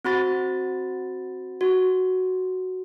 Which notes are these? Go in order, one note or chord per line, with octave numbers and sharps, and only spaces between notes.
C4 F#4 B5 A6
F#4